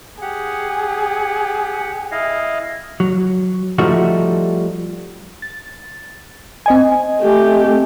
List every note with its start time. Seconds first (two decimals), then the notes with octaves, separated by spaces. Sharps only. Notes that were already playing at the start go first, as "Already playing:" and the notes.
0.22 G4 G#4 F#5
2.12 E4 D#5 F5
3.00 F#3
3.78 F3 G3 A3 D#4 F#4
5.42 A6
6.66 C4 D#5 G#5
7.22 A3 G4